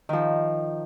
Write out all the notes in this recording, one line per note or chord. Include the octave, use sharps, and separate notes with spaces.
D#3 F3